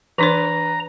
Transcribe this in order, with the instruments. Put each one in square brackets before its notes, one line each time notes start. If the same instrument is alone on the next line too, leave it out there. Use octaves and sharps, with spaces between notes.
[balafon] E3 D4 C5 [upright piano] B4 [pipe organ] A#5